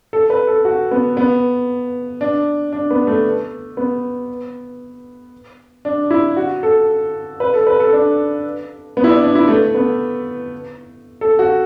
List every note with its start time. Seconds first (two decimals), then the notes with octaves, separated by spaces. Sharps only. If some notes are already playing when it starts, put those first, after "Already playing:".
0.13 A4
0.30 B4
0.47 A4
0.65 F#4
0.91 B3
1.17 B3
2.21 D4
2.73 D4
2.90 B3
3.07 A3
3.77 B3
5.85 D4
6.11 E4
6.37 F#4
6.63 A4
7.40 B4
7.54 A4
7.67 B4
7.80 A4
7.93 D4
8.97 B3
9.04 E4
9.10 D4
9.23 D4
9.35 E4
9.48 A3
9.74 B3
11.21 A4
11.39 F#4